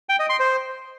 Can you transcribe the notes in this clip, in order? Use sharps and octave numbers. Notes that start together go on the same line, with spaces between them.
G5
D#5
C6
C5